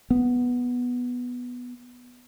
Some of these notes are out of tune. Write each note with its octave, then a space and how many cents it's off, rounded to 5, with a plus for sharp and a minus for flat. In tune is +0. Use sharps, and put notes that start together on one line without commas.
B3 -5